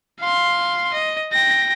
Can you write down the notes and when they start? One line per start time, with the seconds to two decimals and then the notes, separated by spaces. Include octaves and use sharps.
0.21 F5 C6
0.94 D#5
1.33 G5 A#6